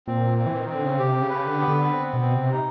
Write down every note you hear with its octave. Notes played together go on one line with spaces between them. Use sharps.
A#2 C4
C4
E3
D#3
C4
D3
C#3
C3 G4
C#3
B4
D3
B3
D3
C4
B2
C4
C3
D#4